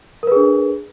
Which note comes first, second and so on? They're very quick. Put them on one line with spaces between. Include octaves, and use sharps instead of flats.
A#4 B4 G#4 D4